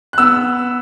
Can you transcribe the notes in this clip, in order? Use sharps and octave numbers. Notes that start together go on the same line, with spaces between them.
F#6
B3 E6